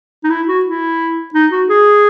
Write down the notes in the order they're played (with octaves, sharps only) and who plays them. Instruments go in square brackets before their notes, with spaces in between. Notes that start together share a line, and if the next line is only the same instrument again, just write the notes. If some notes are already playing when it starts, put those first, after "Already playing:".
[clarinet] D#4
E4
F#4
E4
D#4
F#4
G#4